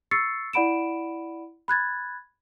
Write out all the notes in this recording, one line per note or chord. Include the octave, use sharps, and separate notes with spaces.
C#6 E6 A6 C7 C#7
E4 D5 F#5 B5 D7 E7
B5 F#6 G#6 A6